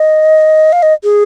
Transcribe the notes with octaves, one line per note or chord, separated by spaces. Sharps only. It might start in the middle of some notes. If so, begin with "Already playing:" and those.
Already playing: D#5
F5
D#5
G#4